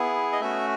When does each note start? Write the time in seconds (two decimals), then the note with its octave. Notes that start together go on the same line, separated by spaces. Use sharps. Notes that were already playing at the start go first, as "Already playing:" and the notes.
Already playing: B3 E4 G#4
0.32 D#5
0.40 A3 C#4 F#4 E5